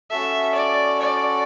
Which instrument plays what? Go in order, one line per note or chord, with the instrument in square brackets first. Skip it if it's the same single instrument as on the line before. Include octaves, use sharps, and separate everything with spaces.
[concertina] C#4 F#4 A4 [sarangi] E5
[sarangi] D5
D5